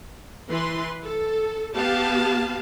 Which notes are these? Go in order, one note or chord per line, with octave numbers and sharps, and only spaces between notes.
E3 B4 C6
A4
B3 G4 F5 A5